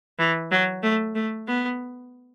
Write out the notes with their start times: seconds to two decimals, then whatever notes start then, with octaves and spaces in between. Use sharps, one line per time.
0.19 E3
0.51 F#3
0.83 A3
1.15 A3
1.47 B3